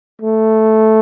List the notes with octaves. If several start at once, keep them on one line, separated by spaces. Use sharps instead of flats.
A3